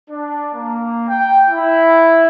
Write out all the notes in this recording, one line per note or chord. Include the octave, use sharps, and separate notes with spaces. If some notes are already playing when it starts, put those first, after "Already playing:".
D4
A#3
G5
E4